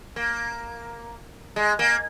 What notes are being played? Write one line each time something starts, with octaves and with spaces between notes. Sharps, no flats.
A#3
G#3
A#3